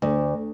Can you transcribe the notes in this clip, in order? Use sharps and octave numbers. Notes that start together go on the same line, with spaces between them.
D2